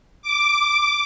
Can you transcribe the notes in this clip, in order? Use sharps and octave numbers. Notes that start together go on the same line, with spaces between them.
D6